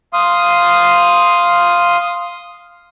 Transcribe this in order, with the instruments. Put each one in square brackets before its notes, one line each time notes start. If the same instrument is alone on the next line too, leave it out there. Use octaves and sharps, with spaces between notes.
[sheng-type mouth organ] F5 C6 D#6